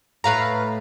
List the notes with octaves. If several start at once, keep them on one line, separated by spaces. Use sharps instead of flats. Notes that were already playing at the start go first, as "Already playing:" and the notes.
A2 A3 B4 F5 A#5